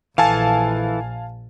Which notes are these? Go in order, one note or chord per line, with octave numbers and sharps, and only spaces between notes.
A#1 E3 A4 F5 G#5 A5